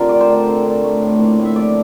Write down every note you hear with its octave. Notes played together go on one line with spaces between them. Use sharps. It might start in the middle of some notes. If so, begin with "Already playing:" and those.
Already playing: D3 C4 F4 G4 A#4
A3 D5
C5
D3
C4
D3
A3
A2
A#3
A2
E5
F3 D5